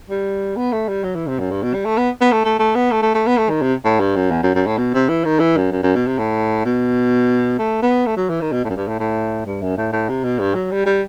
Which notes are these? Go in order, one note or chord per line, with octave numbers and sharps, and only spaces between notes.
G3
B3
A3
G3
F#3
E3
C3
F#2
G2
B2
G3
A3
B3
B3
A3
A3
A3
B3
A3
A3
A3
B3
A3
D#3
C3
A2
G2
F#2
E2
F#2
F#2
A2
B2
C3
E3
D#3
E3
F#2
F#2
F#2
B2
C3
A2
B2
A3
B3
A3
F#3
E3
D#3
B2
A2
F#2
G2
A2
A2
G2
F#2
A2
A2
C3
B2
G2
F#3
G3
G3